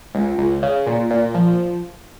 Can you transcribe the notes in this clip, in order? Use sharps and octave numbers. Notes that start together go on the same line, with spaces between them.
C#2
C#2
C#3
A#2
A#2
F3